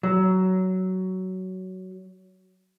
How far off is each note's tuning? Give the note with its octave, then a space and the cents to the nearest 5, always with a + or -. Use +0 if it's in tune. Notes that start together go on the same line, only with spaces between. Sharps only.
F#3 +15